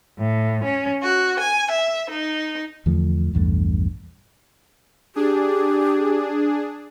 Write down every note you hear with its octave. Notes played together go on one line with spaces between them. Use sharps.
A2
C#4
F#4
G#5
E5
D#4
E2 D3 F3 A3
A#1 E2 G2 A3
D4 G4 G#4